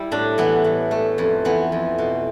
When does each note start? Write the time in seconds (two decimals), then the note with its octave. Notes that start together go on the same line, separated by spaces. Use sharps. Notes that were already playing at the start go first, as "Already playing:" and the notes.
Already playing: G3 E4 G4
0.11 A2 D4
0.38 E3 B3
0.64 A2
0.91 A3
1.18 F2
1.45 E3 B3
1.72 F2
1.98 B2